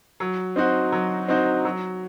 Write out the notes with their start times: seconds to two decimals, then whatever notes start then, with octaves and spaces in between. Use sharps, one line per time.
0.20 F#3
0.56 C4 D#4 F#4 C5
0.92 F#3
1.28 C4 D#4 F#4 C5
1.65 F#3